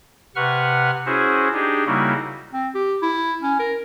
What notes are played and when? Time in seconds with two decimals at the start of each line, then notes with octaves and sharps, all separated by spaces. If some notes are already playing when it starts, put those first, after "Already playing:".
0.36 C3 B4 F#5 C#6 F6
1.06 C#4 E4 F#4 G#4 C5
1.53 D4 D#4 G4 G#4
1.87 C#3 G3 A#3 D#4 E4 F#4
2.53 C4
2.74 G4
3.02 E4
3.42 C#4
3.59 A#4